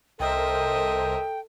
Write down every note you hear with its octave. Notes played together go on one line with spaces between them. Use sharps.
C2 A4 A#4 C5 D#5 E5 G5